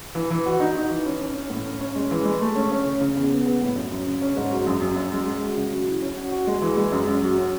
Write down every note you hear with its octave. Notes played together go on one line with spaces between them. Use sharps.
E3
E3
F#4
D#4
D#4
E3
C#4
C#4
C#4
A2
C#4
C#4
G#3
E3
G#3
A3
C#4
C#4
C#3
C#3
E2
B3
B3
A2
F#2
F#2
C#3
C#4
G#2
F#3
F#2
F#2
F#2
G#3
G#3
F#4
C#3
F#3
E4
C#4
F#4
F#4
G#3
E3
G#3
F#2
F#2
F#3
C#4